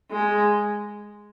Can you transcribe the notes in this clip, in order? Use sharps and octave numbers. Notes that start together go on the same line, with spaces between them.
G#3